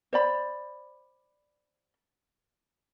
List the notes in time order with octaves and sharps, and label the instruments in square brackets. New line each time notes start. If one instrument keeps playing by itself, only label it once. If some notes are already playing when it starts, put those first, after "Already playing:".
[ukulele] C5 D5 B5